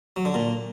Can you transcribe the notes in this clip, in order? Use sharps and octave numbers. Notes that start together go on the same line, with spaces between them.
F#3
D3
A#2